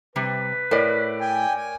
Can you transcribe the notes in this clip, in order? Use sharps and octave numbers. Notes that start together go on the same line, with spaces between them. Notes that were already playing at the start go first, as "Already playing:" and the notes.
C3 G3 B4
A2 A#4 C#5 D5
G5 G#5
G#5